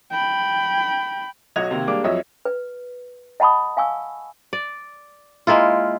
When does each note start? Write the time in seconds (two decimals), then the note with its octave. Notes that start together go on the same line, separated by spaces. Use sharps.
0.11 G5 B5
1.56 B1 F#3 F#4 D#5 G#6 F7
1.71 C3 D#3 A#3
1.87 G3 G#3 A#3 D4 D6
2.04 F2 F#3 C#5 D#5 E5
2.45 B4
3.40 D#5 F#5 A5 B5 C#6 D#6
3.77 F5 G#5 C#6 E6
4.53 D5
5.47 G#3 A#3 E4 F4